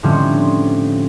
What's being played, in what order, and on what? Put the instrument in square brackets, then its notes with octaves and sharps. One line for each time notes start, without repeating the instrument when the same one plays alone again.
[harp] A2 D3 F3 G3 C4 C#4